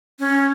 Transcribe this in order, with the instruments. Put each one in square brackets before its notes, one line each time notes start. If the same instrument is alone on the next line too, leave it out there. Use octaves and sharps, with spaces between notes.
[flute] C#4